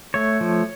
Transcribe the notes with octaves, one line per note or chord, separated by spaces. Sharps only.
A3 C#5
F3